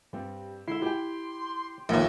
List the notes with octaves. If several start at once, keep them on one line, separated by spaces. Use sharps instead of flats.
G2 G3 C4
D3 G#3 E4 E5 C6
E4 G4 G5
A#1 D#2 A#3 B3 E5